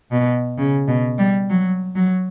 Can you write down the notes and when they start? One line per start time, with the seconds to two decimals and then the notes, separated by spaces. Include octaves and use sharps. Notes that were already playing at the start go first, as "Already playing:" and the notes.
0.12 B2
0.58 C#3
0.88 B2
1.18 G3
1.50 F#3
1.95 F#3